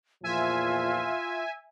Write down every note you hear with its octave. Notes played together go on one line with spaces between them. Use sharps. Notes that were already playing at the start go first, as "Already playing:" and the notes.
E2 A#2 F3 F4 E5 G#5